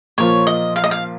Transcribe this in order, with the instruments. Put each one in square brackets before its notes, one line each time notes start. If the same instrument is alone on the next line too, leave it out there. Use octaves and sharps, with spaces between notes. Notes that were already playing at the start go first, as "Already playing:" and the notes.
[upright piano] A#2 F3 A#3 F4 [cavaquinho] C#5
[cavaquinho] D#5
F5
D#5
F5